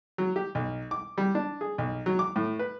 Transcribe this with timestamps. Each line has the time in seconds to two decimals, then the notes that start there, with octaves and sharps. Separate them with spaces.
0.18 F#3
0.36 G4
0.55 B1
0.91 D6
1.18 G3
1.35 D4
1.61 G#4
1.78 B1
2.06 F#3
2.19 D6
2.36 A2
2.59 B4